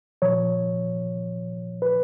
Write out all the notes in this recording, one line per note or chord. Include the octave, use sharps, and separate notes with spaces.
A#2 F3 C#5
B4